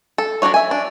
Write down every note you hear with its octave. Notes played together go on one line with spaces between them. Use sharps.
A4
F#3 G#3 D4 F#4 C#5
E5 G#5
D4